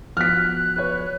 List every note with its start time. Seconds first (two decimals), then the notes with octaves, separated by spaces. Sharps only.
0.17 F3 B3 F#4 F6 F#6 B6
0.76 B4 C#5